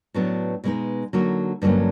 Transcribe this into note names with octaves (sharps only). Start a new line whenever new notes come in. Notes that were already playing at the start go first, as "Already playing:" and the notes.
A2 F#3 B3 D4
B2 G#3 B3 D#4
D3 F#3 A#3 D#4 F#4
G2 D3 F#3 A#3 C#4